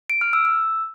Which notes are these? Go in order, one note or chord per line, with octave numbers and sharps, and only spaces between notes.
D7
F6
E6
E6